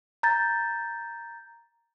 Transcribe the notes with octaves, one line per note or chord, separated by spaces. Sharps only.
A#5 G6 A6